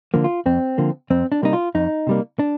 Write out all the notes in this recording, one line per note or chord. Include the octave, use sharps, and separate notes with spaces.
D3 F3 A#3
F4
F2 C4
D3 F3 A#3
F2 C4
D4
C3 G3 A#3 D#4
F4
F2 D#4
C3 G3 A#3
D4